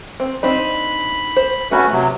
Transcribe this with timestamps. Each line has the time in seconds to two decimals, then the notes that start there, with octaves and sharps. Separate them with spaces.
0.20 C4
0.43 C4 D4 D#4 B5
1.37 C5
1.71 A3 B3 C#4 F#4 A#5 B5
1.92 C3 F#3